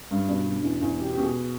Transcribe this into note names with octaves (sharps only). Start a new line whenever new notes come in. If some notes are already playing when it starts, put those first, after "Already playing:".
G2
B2 D4
B2
E2
E2
B2 G4
G4
B2
G#4